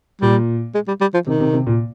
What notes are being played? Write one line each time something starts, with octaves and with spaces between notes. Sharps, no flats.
A#2 G3
G#3
G3
G3
F3
C3 D#3
C3
C3
A#2